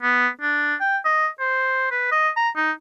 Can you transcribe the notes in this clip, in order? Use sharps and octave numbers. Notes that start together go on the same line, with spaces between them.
B3
D4
G5
D#5
C5
B4
D#5
A#5
D#4